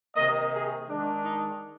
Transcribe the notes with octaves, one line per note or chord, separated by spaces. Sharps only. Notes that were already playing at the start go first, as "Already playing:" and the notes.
C3 D#3 A#3 D#5
G#4
D#3 G#3 D4
D#4